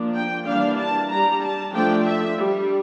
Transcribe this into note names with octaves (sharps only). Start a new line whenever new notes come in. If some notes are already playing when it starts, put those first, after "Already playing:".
Already playing: F3 A#3 D4
G5
E3 G3 A#3 D4 F5
A5
G3 D4 A#5
A5
F3 A3 D4 G5
E5
G3 D4